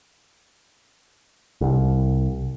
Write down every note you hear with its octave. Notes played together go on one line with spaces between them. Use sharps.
C2